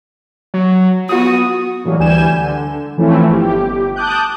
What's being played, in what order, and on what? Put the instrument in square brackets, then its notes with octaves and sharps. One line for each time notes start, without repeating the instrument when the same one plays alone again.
[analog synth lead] F#3
[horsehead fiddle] B3 F#4 [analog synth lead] D#6
[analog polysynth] A2 E3 F#3 G3 A#3
D2 E3 G3 G#5 G6 E7
D3
E3 F3 A3 C4 C#4 E4
G1 G4
A5 D6 D#6 F#6 G6